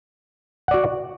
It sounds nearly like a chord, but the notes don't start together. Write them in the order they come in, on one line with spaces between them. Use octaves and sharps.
F#5 D5 F#4